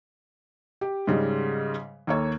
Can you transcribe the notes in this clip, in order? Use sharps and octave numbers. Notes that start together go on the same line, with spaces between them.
G4
G#2 C#3 G3 G#3
D#2 A#3 A4 C#5